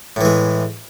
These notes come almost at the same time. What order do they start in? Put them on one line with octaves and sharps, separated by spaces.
A2 E3 G#3